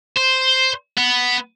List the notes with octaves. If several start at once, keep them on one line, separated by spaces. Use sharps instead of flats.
C5
B3